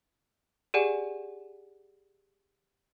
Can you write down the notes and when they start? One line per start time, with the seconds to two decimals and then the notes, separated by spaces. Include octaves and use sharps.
0.74 G4 G#4 D5 F#5 G#5